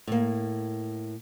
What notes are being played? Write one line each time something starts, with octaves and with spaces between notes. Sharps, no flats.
A2 A#3